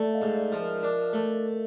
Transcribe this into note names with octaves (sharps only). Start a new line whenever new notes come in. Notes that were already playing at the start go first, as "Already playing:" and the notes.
Already playing: A3 D5 E5
D#5 F5
G#2
D5 E5
F3
A#4
D4 A#4
A3